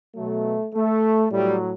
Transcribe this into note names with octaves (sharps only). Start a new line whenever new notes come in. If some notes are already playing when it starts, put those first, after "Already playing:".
B2 F#3 A3
A3
A2 F#3 G3